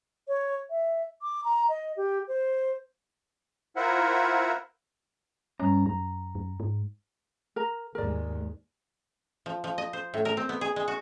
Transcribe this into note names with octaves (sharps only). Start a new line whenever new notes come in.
C#5
E5
D6
A#5
D#5
G4
C5
E4 F4 A#4 C5 E5 F#5
G2 C#4 A#5
F#2 A#5
F#2
G#2
A#4 A#5
D#2 G#2 G#3 A#4 D5
F3
F3
D#5
C5
A2
A#4
C4
B3
G#4
G#3
F#4